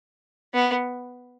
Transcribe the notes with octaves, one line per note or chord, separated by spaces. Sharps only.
B3